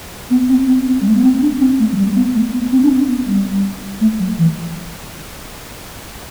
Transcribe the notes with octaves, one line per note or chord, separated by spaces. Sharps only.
B3
C4
C4
C4
G3
A3
B3
C4
D4
C4
A3
F#3
G3
B3
A3
B3
C4
D4
C4
B3
G3
A3
F#3
E3